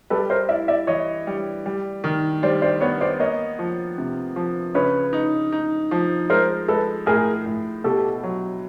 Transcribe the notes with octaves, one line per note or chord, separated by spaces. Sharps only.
G3 A4 B4
A#4 C5
E4 D5 E5
D5 E5
E3 C#5 D#5
G3
G3
D#3
G3 C5 D5
C5 D5
B3 B4 C#5
C5 D5
A#3 C#5 D#5
F3
C3
F3
C#3 B4 C#5
D#4
D#4
F3
G#3 A#4 C5
G#3 A4 B4
A2 G#4 A#4
A2
B2 G4 A4
F#3